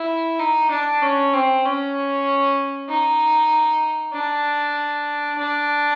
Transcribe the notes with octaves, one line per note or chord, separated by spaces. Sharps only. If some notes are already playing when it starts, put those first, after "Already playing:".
Already playing: E4
D#4
D4
C#4
C4
C#4
D#4
D4
D4